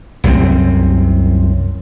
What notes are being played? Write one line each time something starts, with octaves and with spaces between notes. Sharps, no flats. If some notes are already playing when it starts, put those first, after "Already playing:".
C2 F#2 G3 C4